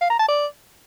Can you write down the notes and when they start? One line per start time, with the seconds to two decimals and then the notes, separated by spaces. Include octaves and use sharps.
0.01 F5
0.10 A#5
0.19 A5
0.28 D5